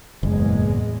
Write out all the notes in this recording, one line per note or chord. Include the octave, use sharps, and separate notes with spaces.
F#1 E2 A2 G#3